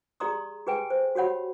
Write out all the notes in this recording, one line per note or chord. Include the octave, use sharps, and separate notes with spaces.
G4 G#4 D5 A#5 C6 D#6
G4 G#4 B4 G5 G#5
C5
F#4 G4 C#5 F#5 B5